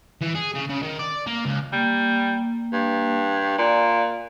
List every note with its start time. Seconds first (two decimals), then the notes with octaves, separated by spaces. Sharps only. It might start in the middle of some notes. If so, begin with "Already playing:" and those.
0.21 E3
0.35 G#4
0.55 C#3
0.69 C#3
0.83 D#3
0.99 D5
1.27 A#3
1.45 C#2
1.73 G3 A#3
2.73 G2
3.58 A#2 D5 F5